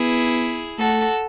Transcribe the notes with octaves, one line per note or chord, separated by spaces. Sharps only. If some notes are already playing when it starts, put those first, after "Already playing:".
Already playing: B3 E4 G#4
A3 F#4 A4